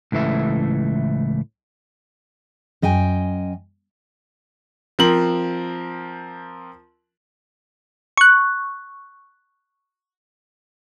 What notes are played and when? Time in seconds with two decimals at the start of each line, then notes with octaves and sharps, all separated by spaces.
0.12 C#2 A2 E3 A3 E5
2.82 F#2 D#5 G5 G#5
4.99 F3 C4 A#4 F#7
8.17 C#6 F#6